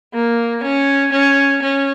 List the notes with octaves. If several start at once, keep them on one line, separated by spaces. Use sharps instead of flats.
A#3
C#4
C#4
C#4